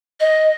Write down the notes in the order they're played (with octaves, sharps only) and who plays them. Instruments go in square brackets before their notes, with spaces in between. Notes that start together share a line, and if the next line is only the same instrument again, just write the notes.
[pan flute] D#5